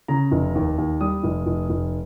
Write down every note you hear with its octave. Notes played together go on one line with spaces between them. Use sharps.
C#3 A#5
F1
D#2
D#2
G3 D#6
F1
F1
F1